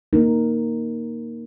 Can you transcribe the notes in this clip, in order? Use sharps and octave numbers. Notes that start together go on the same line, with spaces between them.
A#3 D#4 A#4